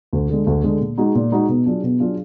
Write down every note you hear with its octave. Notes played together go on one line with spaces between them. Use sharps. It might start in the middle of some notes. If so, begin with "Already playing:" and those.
D2
D3 G#3
D2
D3 G#3
A#2
G#3 D#4 F#4
A#2
G#3 D#4 F#4
B2
F#3 D4 F4 G#4
B2
F#3 D4 F4 G#4